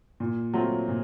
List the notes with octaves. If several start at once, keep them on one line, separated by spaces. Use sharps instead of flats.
A#2
F#3 A3 C4 F4
A#2